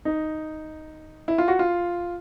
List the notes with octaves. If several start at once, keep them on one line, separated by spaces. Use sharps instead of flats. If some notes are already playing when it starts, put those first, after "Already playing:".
D#4
E4
F4
F#4
F4